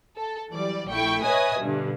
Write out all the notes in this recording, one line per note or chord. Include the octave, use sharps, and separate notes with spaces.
A4
E3 F#3 G3 D5
A#1 A3 E4 G5 C#6
B4 C#5 D#5 E5 G#5 D#6
G2 B2 D3